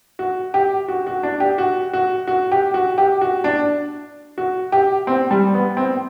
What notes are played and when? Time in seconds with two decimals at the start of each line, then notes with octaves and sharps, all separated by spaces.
0.19 F#4
0.54 G4
0.88 F#4
1.07 F#4
1.23 D4
1.40 G4
1.58 F#4
1.93 F#4
2.27 F#4
2.52 G4
2.74 F#4
2.98 G4
3.21 F#4
3.44 D4
4.38 F#4
4.72 G4
5.07 C4
5.31 G3
5.54 B3
5.77 C4